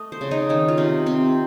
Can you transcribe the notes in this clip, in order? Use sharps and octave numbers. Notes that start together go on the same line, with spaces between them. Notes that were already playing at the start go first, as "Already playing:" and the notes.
Already playing: A3 D#5
C5
C#3
D#4
D#3 C#4
F4
C3 D#4
C3 C4